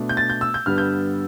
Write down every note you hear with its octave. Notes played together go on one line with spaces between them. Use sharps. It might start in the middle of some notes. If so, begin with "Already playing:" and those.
Already playing: B2 A3 D4
G6
A6
G6
E6
G6
G2 D3 G3 B3 F6
G6